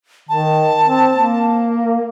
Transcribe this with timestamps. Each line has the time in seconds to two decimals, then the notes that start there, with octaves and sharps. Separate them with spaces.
0.29 D#3 A5
0.85 C4
1.16 A#3